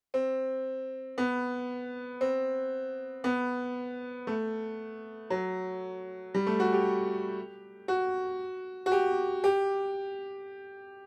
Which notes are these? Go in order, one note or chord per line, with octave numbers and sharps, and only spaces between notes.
C4
B3
C4
B3
A3
F#3
G3
A3
F#4
G4
F#4
F#4
G4
G4